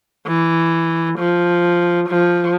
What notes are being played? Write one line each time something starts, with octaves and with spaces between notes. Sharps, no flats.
E3
F3
F3